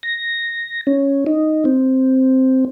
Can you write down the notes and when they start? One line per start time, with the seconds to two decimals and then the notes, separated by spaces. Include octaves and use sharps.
0.03 A#6
0.87 C#4
1.26 D#4
1.65 C4